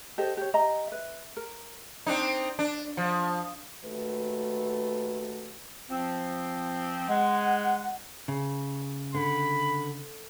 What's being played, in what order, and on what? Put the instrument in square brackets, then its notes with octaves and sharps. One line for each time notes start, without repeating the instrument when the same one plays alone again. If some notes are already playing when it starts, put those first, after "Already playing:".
[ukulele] G4 A4 C5 D#5
G4 C#5
G4 D#5 A#5
B4 E5
A#4
[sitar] C4 D4 D#4
D4
F3
[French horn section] D#2 A3 F#4 B4
[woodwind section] F3 C4
[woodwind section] G#3 [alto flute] F#5
[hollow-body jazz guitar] C#3
[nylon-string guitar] D3 [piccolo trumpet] B5